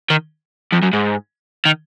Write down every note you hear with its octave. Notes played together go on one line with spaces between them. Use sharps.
D#3
F2
F#2
G#2
D#3